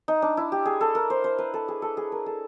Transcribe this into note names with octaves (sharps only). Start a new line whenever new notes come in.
D#4
D4
E4
G4
G#4
A4
A#4
C5
C5
B4
A4
G#4
A4
G#4
A#4
A4